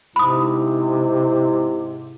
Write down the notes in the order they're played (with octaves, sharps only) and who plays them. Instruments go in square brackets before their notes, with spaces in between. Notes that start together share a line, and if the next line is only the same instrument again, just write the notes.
[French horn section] G#2 E4 [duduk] C3 [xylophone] B5 D#6